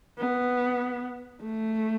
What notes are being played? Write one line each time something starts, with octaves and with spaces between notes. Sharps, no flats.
B3
A3